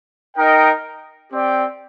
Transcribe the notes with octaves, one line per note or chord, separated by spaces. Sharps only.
D#4 A#4 D#5 G5
C4 G4 D5 G5